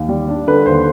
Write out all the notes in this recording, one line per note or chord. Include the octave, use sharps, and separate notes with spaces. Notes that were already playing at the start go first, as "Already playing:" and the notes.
Already playing: D#2
G3
D4
D3 B4
D#2 C5